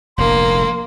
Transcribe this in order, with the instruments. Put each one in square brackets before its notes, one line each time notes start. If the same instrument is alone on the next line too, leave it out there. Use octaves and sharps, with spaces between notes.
[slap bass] F1 A#1 A2 [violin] A#3 [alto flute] C6